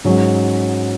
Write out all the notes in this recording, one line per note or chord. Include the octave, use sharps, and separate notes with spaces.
G#2 F#3 C#4